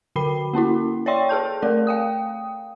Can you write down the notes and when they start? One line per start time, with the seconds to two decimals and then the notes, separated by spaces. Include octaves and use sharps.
0.16 D3 F#4 G5 B5 C7
0.53 A#3 C#4 E4 F#4
1.06 C#5 D5 E5 G5 C6 C#6
1.29 G#4 A4 A5 G6
1.62 A3 A#4 D5
1.87 F5 G5 D#6